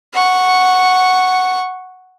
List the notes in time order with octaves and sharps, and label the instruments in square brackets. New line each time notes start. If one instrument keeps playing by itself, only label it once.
[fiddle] F#5 C#6